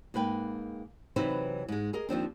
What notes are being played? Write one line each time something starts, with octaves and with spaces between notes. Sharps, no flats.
G#2 A#3 B4 G5
C3 E3 F#3 D#4 B4 C5
G#2 G#3
G#4 A#4 D#5
D#2 F3 C4 D4